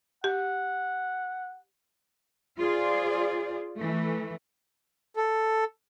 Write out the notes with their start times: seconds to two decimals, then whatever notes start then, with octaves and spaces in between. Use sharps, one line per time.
0.24 G4 F#5
2.58 F4 G#4 C5 D5
3.77 E3 A3
5.17 A4